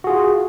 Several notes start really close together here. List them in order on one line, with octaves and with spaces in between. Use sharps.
F#4 G#4 F4